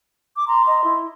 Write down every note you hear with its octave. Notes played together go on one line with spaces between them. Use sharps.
D6
A#5 C6
D#5
E4